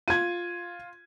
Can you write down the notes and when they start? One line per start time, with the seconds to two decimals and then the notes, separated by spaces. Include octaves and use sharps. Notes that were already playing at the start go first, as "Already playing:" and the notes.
0.08 F4 G#6 D#7